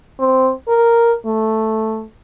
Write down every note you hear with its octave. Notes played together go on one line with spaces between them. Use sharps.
C4
A#4
A3